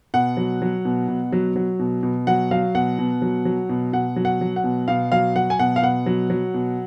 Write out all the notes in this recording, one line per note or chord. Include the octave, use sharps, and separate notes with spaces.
B2 F#5
F#3
F#3
B2
B2
F#3
F#3
B2
B2
F#3 F#5
F#3 F5
B2 F#5
B2
F#3
F#3
B2
B2 F#5
F#3
F#5
F#3
F#5
B2
B2 F5
F#3 F5
F#3 F#5
G#5
B2 F#5
F5
B2 F#5
F#3
F#3
B2